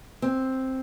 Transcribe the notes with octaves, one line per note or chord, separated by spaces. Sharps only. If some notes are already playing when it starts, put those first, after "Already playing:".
C4